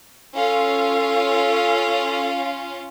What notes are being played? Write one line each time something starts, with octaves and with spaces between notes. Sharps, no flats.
C#4 F4 A4 F5